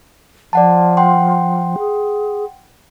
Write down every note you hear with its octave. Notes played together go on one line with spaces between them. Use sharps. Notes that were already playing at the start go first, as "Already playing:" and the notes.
F3 D5 F#5 A5
F#5 G5 C6
G#4